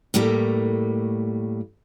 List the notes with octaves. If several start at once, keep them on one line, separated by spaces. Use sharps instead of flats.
A2 G3 A3 A#3